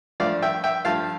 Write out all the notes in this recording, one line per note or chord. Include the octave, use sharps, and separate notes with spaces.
G2 F3 A3 D5 F5
E5 G5
E5 G5
G2 F3 A3 F5 A5